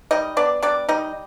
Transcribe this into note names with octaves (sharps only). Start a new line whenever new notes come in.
G3 D#4 D#5
B3 D4 D5
G3 D4 D5
G3 D#4 D#5